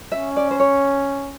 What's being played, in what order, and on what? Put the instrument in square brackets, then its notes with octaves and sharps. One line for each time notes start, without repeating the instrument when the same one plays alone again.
[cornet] C#4 [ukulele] E5
[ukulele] D5
C5
C#5